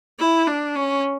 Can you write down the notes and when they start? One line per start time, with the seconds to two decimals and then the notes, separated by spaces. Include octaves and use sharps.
0.19 E4
0.47 D4
0.76 C#4